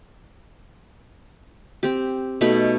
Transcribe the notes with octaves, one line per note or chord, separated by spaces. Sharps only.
C4 G4
B2 A3 D#4 B5